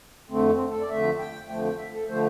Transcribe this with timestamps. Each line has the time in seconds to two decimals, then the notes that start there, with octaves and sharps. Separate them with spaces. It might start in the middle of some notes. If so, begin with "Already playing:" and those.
0.30 F2 D3 A3 C4
0.50 C4
0.69 A4
0.80 D5
0.89 F2 D3 A3 E5
1.19 G5
1.49 F2 D3 F3 A3 G5
1.64 G5
1.78 E5
1.93 A4
2.08 D3 F3 A3 C5